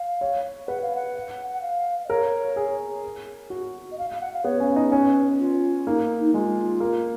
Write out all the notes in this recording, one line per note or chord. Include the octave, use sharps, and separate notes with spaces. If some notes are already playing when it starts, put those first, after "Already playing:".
Already playing: F5
C#5
B4 F#5
F5
F#5
F#5
F5
D#5
A#4 C#5
G#4
F#4
D#5
F5
F5
F#5
F5
B3 C#5
C#4
D#4
C#4 B4
F4
A#3 D#4
D#4
G#3 F4
A#3